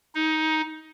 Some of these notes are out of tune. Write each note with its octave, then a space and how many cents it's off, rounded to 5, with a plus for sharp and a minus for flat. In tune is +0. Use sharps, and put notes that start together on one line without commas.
D#4 +15